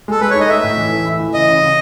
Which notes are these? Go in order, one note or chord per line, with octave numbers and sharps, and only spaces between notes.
G#3 A4
G#3 B4
C#5
D#4
D#5
A3 E5
A2
E3
A3
E4
E3
C#3 D#5
C#3
C#3